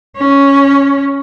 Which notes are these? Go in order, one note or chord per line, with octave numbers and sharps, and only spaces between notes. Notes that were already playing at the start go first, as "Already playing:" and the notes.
C#4